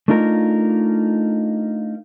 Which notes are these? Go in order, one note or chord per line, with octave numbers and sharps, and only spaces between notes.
A3 D4 D#4 F4 A#4